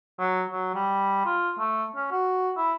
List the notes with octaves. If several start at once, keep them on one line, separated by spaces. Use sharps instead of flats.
F#3
F#3
G3
F4
A3
C#4
F#4
E4